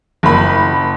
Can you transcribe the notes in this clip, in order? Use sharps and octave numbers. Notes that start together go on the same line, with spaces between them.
F#1 B5